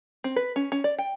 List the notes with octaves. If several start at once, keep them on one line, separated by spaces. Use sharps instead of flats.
C4
B4
C#4
C#4
D5
G5